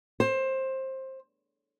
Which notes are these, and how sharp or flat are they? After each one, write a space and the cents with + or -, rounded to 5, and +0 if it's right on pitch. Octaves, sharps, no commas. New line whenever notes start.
C5 +20